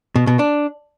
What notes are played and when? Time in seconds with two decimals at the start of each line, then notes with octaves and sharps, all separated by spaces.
0.16 B2
0.27 B2
0.39 D4